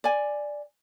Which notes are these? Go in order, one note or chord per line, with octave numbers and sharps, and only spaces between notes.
D5 G#5